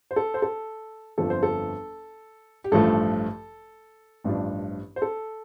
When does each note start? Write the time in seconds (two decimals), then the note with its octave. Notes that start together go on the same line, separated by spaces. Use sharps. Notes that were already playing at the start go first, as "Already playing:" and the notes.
0.11 C5
0.16 A4
0.34 C5
0.42 A4
1.18 G1 F2 F3 A4
1.30 C5
1.43 A4
2.64 G4
2.72 A1 G2 F3 A3 A4
4.24 A1 G2 F3 D4
4.96 C5
5.02 A4